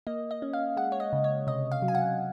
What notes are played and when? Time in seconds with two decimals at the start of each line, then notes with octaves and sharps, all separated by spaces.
0.07 A#3 D#5
0.31 D#5
0.42 C#4
0.53 F5
0.76 G#3 F#5
0.92 C#5
1.00 D#5
1.13 C#3
1.24 C#5
1.47 C3 D#5
1.71 F5
1.82 F#3
1.88 G#5
1.95 F#5